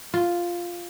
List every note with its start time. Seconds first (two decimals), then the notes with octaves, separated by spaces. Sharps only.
0.14 F4